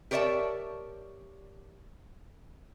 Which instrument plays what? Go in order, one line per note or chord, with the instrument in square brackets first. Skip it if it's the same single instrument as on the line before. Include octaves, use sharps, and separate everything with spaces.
[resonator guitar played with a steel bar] G4 A#4 C#5 D5 E5 A5